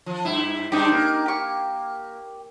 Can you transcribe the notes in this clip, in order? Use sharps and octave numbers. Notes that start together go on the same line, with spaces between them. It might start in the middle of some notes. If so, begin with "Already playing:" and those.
F3
G2 E4
G2 D4 D#4 G4
A#3
G4 C#6